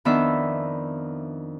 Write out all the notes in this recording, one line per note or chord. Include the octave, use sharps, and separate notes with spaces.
F2 D#3 B3 D4 E5